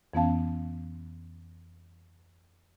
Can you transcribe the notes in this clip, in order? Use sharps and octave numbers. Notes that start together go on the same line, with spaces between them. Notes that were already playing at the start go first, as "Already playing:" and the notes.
F2 E3 B3 C#4 F5 A5